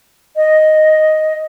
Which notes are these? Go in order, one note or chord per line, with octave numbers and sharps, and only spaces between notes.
D#5